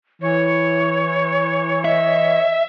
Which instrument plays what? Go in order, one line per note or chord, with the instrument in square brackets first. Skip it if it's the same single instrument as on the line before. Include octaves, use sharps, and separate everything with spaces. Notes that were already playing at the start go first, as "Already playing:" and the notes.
[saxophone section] E3 [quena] C#5
[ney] D#5 [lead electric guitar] E5